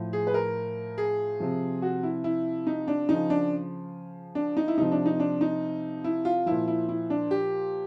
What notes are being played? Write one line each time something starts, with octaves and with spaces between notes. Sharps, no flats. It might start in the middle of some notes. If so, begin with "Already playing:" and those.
Already playing: A2 F3
G#4
B4
A#4
G#4
C3 F3
F#4
E4
E4
D#4
D4
C#3 F3 D#4
D4
D4
D#4
E4
C3 F3 D#4
D4
D#4
D4
D#4
E4
F4
A#2 F3 E4
E4
E4
D4
G4